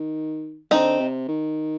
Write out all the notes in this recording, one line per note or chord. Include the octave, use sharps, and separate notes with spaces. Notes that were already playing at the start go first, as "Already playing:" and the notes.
Already playing: D#3
D3 C4 D#4
C3
D#3